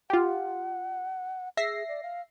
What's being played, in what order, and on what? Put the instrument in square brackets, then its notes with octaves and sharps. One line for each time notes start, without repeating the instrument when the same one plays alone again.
[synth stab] F4 G4 [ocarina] F#5
[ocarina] G#4 [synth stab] E5 A#6 C7
[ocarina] D5
F5